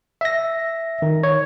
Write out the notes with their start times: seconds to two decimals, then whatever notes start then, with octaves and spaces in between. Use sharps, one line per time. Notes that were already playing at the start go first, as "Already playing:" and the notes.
0.21 E5 A#6
1.02 D#3
1.23 C#5